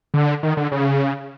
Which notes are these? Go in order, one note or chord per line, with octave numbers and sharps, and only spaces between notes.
D3
D#3
D3
C#3